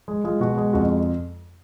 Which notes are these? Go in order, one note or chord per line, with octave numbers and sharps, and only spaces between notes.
G#3
G#3 F4
B2 F#4
G#3
F2 F#4